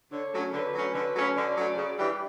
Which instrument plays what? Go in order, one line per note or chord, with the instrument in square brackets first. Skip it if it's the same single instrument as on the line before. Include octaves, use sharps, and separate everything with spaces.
[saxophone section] D3 [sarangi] C#5
[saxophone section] F#3 A3 C#4
[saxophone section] D3 [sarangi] B4
[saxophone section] F#3 A3 C#4
[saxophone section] D3 [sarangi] B4
[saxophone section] F#3 A3 C#4
[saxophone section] D3 [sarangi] D5
[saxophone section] F#3 A3 C#4
C#3
E3 G3 D4 G4